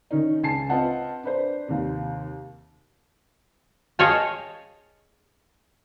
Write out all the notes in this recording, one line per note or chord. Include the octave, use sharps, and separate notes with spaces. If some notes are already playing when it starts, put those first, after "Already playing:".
D#3 C#4 D#4
C#2 G#5 A5 C7
C4 F4 B4 D#5 F#5 A5
D4 B4 C5
D#2 C3
G#4 C#5 D#5 F5 G5 A5